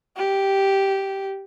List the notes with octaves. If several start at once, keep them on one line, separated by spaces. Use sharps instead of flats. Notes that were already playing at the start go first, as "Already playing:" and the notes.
G4